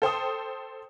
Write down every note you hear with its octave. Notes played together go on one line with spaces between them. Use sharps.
A4 C5 G5 D#6